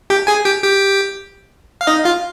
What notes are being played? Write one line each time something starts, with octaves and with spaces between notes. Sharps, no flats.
G4 G5
G#4 G#5
G4 G5
G4 G5
F5
D#4 D#5
F4 F5